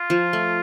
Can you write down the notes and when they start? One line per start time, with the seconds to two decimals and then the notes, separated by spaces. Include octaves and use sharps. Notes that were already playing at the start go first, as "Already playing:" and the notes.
Already playing: F4
0.10 F3
0.33 A3